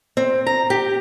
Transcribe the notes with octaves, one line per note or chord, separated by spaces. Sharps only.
C4
A#5
G4